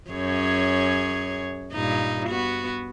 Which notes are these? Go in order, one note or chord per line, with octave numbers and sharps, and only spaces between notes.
F#2 G#4 C#5
G2 A#2 D#4
B3 F#4